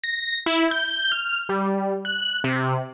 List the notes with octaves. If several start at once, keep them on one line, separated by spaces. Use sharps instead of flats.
A#6
E4
G6
F6
G3
F#6
C3